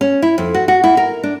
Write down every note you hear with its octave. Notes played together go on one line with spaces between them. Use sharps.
C#4
E4
F2
F#4
F#4
E4
A#4
D4